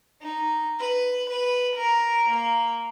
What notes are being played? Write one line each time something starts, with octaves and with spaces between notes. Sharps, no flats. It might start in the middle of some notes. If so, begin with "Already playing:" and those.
D#4
B4
B4
A#4
A#3